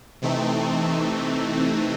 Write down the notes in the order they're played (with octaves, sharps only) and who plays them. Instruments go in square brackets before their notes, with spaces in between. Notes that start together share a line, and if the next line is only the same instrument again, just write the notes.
[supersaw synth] C3 E3 A3 C4 D#4